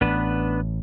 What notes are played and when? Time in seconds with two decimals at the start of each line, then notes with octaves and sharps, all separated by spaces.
0.01 A1 B3 D4 B4